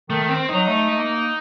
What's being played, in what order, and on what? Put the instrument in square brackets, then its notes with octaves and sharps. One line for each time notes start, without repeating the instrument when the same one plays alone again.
[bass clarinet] D#3 [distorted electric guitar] A3
[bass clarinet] D#3 [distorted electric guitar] C4
[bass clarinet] F#3 [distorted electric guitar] D#4
[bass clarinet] A3
A3
A#3